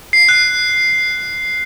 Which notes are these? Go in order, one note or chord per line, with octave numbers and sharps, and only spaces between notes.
C7
F#6